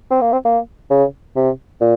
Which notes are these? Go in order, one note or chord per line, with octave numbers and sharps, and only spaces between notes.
C4
A#3
C4
A#3
C#3
C3
A#2